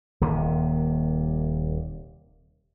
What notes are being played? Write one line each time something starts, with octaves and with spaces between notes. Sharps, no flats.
D#1 D#2 C3